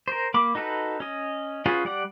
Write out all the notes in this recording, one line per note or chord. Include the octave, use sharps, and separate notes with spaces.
A#4 C5
A#3 B5 D6
D#4 F#4 A4 B4
C#4 D#5
C#4 F4 F#4 G#4 B4
G3 D5 F#5